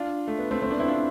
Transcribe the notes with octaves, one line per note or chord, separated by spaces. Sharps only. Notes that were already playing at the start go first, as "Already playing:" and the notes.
Already playing: D4 F4
A3
B3
A3 C4
A3 C4
B3 D4
C4 E4
D4 F4